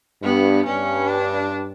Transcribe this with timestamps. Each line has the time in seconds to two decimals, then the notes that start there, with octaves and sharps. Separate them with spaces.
0.23 G2 B3
0.65 G2 C#4
1.07 D4